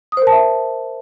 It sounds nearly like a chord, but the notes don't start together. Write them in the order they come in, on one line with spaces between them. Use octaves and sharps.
D#6 C5 A#4 A5 E5